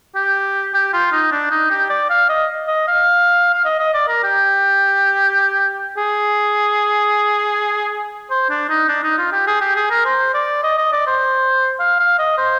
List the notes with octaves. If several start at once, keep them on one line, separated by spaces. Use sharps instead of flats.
G4
G4
F4
D#4
D4
D#4
G4
D5
F5
D#5
D#5
F5
F5
D#5
D#5
D5
A#4
G4
G#4
C5
D4
D#4
D4
D#4
F4
G4
G#4
G4
G#4
A#4
C5
D5
D#5
D#5
D5
C5
F5
F5
D#5
C5